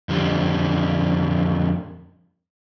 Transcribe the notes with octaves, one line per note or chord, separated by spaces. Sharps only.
F2 D3 G3